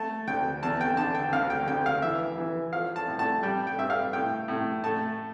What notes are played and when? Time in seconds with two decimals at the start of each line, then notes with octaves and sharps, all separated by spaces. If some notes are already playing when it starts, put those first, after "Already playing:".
Already playing: A3 A5
0.27 D2 G5
0.63 E2 A5
0.81 G5
0.97 D3 A5
1.15 G5
1.32 D2 F5
1.50 G5
1.67 D2 G5
1.86 F5
2.02 E3 E5
2.38 E3
2.73 F3 F5
2.96 A5
3.08 A2
3.19 A5
3.43 G3 G5
3.67 G5
3.78 G2 E5
3.90 F5
4.13 A2 G5
4.48 A2
4.84 A3 A5